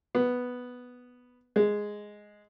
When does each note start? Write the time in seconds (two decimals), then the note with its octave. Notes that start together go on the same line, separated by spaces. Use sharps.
0.15 B3
1.56 G#3